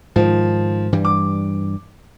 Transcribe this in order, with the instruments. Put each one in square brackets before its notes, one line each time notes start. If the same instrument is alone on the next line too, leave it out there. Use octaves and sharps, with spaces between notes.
[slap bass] G#2 D#3 [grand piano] F3
[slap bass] G2 E3 G3
[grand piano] D6